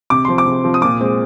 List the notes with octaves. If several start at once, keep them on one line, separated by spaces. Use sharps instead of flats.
C3 D6
F3 C4 C6
D6
C3
F3 C4
D#6
A#2 D6
G#3 C4